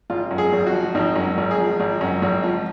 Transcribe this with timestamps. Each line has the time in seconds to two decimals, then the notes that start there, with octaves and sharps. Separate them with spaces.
0.10 G#1 F4
0.31 F#2
0.38 G#4
0.53 G#1
0.67 F#4
0.73 F3
0.95 G#1 D#4
1.16 F#2
1.38 G#1
1.51 G#4
1.58 F3
1.80 G#1
2.01 F#2
2.22 G#1
2.43 F3